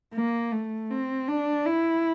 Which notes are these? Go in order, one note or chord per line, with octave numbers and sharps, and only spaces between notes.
A#3
A3
C4
D4
E4